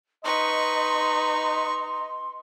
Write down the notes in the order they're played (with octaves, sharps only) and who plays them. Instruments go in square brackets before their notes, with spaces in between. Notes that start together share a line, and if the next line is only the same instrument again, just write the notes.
[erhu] D#4 [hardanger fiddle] B4 C#6 [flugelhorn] D#5 [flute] C6